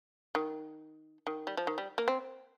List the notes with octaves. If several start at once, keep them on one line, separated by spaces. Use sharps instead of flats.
D#3
D#3
G3
F3
D#3
G3
A#3
C4